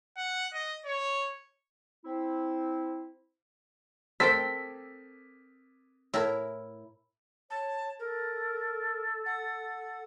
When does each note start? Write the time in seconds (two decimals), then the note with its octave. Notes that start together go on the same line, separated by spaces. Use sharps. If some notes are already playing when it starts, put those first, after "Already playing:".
0.17 F#5
0.53 D#5
0.86 C#5
2.05 C4 E4
4.20 C4 A4 A#4 G5 B6
6.14 A2 E4 A#4
7.50 C#5 A5
7.99 A4 A#4
9.26 F#5